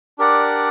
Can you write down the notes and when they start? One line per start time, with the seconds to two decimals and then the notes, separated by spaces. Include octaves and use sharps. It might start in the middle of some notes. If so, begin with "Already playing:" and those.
0.18 D4 G4 A#4 D5 F#5